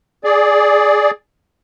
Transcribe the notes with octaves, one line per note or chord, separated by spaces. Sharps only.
G#4 D5